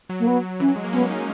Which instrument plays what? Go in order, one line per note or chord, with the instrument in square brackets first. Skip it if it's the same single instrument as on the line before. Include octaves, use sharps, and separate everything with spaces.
[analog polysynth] F#3
[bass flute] A#3
B3
[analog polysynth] E3 [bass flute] C#4
[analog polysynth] F#3
G#3
A#3
[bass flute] B3 [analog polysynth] C#4
[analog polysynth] D#4